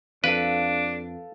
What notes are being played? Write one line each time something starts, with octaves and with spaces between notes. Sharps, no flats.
F2 D4 A4 B4 F5